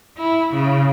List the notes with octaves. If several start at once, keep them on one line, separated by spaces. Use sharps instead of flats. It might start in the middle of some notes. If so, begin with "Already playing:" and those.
E4
C#3